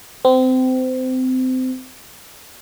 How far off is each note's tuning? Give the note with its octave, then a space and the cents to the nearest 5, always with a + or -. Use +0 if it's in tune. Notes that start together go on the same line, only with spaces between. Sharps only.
C4 -25